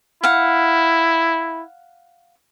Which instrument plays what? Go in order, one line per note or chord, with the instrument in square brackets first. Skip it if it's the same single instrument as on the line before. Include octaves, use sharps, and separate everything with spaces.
[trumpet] E4 [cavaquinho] F5 F#5